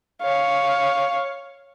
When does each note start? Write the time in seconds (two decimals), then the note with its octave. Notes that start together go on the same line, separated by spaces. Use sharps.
0.22 C#5 F5